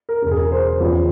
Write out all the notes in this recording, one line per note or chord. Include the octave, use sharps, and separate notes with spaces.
A#4
E1 E2 C#3
G#4
A#4
C5
E2 C#3 F3